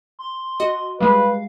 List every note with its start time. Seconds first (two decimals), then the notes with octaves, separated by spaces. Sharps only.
0.19 C6
0.60 F#4 D#5
1.00 G3 G#3 B4 F5